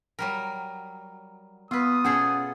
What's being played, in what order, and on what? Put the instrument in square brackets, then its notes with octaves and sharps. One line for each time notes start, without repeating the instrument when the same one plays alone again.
[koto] F#3 G3 A#4
[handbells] B3 [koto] F4 B4 [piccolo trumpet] D#6
[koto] B2 G#4 A4 [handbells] C#4 F#5